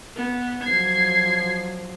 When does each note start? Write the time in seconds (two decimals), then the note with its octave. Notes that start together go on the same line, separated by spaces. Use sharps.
0.16 B3
0.63 F3 F#3 G#6 C7